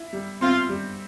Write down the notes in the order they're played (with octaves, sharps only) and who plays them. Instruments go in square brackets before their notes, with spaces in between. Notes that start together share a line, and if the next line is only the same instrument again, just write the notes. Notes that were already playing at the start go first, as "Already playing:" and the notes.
Already playing: [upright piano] E4
G3
[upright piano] C4 [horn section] F4
[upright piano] G3